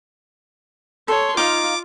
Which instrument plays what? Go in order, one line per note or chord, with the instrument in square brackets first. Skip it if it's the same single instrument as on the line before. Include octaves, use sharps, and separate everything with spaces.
[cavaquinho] A4 [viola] C#5 C6
[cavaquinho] D#4 F5 [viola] F4 [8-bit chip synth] D6